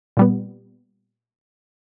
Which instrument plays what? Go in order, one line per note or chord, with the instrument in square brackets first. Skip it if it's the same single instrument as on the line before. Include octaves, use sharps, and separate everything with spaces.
[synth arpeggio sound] A#2 G3 B3